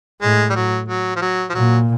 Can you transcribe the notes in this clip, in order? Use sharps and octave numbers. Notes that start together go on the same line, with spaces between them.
A2 G#3
G3
F#3
F#3
F3
F#3
F3
A#2 F#3